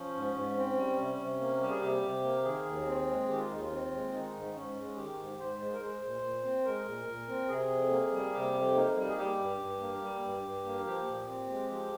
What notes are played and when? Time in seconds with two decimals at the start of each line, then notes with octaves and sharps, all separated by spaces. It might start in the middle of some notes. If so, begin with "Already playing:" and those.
Already playing: F3 C#4
0.14 G#2
0.34 G#2
0.56 C4
0.76 G3
0.97 C3
1.18 C3
1.40 A#3
1.60 G3 G4
1.70 G#4
1.80 C3 G4
2.02 C3
2.23 A#3
2.44 D#3 G#4
2.66 D#2
2.86 C4
3.07 G#3
3.28 D#3 G4
3.38 F4
3.50 D#2 D#4
3.60 F4
3.71 C4
3.92 G#3
4.13 D#3 D#4
4.34 G#2
4.54 G#2 C#4
4.75 G#3
4.96 D#3 G4
5.17 G#2
5.38 G#2 C5
5.60 G#3
5.73 A#4
5.80 G#3 C5
6.01 A#2
6.22 A#2
6.43 C4
6.65 G#3 A#4
6.85 A#2
7.06 A#2
7.28 C4
7.48 C3 G#4
7.70 F2
7.90 A#3
8.12 G3
8.33 C3 G4
8.53 F2
8.74 A#3 D#4
8.96 G3
9.09 G#4
9.17 G3 G4
9.38 G2
9.59 G2
9.80 A#3
10.02 G3
10.22 G2
10.42 G2
10.64 A#3
10.85 F3 G4
11.07 A#2
11.28 C4
11.48 G#3
11.69 F3 G4